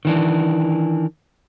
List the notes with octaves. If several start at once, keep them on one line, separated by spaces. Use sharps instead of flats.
D#3 E3 D4